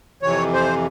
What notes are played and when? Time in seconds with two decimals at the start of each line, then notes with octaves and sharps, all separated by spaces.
0.23 F2 C3 E3 C#5
0.53 C5